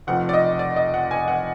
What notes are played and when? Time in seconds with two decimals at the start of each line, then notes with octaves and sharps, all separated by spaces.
0.07 F1 F2 F3 F#5
0.29 D5
0.33 D#5
0.59 D5
0.76 D#5
0.94 F#5
1.11 G#5
1.28 F#5